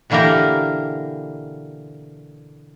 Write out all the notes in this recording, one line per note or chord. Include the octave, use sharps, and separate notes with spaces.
B2 D3 E3 A#3 G4 A#4